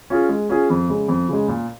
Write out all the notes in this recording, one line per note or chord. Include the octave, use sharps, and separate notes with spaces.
C#4 F4 G#4
G#3
C#4 F4 G#4
F2
C#3 G#3
F2
C#3 G#3
A#2